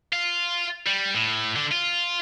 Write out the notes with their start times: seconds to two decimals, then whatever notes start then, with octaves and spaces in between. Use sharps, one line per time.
0.13 F4
0.86 G3
1.15 A2
1.56 D3
1.72 F4